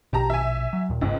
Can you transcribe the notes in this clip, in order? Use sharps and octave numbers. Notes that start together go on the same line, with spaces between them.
A#1 B2 G4 A5 A#5
E5 G#5
F#3
D#2 A#2
G1 C#2 G#2